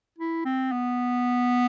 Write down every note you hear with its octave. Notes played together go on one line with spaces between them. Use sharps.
E4
C4
B3